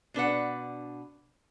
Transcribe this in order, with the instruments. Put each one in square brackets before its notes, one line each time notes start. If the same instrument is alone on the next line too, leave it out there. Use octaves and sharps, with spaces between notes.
[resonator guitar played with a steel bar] B2 D4 B4 F#5